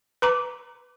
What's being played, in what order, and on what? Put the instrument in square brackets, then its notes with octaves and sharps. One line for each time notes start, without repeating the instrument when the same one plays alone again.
[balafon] B4 A#5 D6